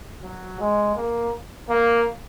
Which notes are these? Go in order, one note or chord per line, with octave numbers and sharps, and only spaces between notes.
F#3
G#3
A#3
A#3